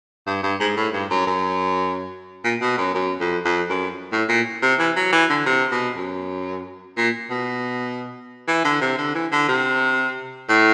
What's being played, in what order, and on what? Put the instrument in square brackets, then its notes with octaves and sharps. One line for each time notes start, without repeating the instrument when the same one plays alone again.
[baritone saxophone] G2
G2
G#2
A2
G2
F#2
F#2
A#2
B2
F#2
F#2
F2
F2
F#2
A2
A#2
C3
E3
F#3
E3
D3
C3
B2
F#2
A#2
B2
E3
D3
C3
D3
E3
D3
C3
A2